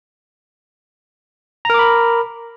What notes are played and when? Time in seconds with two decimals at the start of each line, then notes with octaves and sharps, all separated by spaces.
1.65 A#5
1.70 A#4
1.74 D6
1.79 B5